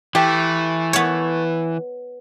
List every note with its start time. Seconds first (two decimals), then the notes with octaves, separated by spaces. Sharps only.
0.15 E3 A3 G4
0.93 B3 C#5